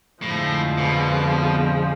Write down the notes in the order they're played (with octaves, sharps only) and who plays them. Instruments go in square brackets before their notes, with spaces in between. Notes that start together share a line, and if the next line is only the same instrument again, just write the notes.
[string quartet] F2 D3 F3 G#3 [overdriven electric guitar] A2
[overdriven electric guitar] B2